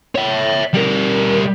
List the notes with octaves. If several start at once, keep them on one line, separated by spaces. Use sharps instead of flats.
C#5 E5
G3 A#4